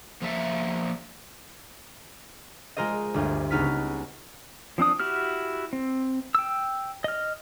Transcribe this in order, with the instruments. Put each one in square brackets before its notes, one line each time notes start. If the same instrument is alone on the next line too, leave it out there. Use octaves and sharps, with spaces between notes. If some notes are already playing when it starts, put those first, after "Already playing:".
[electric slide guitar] F3 A3 A#3 A4 E5
[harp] G#3 F4 A#4 C5 D#5
G1 D2
C#2 B3 D#4 F6 B6
[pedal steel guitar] F3 C4 D4 D#6
E4 F#4 G4 F6
C4
G5 E6
D#5 F6